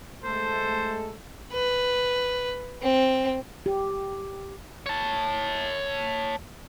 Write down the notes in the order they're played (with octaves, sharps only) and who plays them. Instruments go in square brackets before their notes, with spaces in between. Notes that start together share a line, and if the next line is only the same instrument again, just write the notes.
[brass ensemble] G#3 A3 A4 [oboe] C5
[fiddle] B4
C4
[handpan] G4
[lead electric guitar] C#5 A5